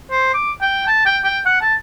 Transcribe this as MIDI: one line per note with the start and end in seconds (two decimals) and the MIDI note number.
0.11 0.31 72
0.34 0.52 86
0.61 0.84 79
0.87 1.03 81
1.06 1.17 79
1.24 1.38 79
1.46 1.58 78
1.61 1.74 81